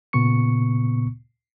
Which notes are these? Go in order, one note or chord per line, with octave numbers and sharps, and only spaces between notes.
A#2 C#3 B3 C#6 C#7